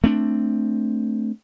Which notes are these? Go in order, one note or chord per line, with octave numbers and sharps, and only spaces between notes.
A3 C4 D4